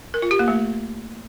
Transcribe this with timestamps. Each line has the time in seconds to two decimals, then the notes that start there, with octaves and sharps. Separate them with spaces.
0.14 A#4
0.22 F4
0.31 G4
0.39 A#3
0.48 A3